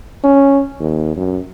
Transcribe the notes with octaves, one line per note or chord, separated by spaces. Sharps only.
C#4
D#2
F#2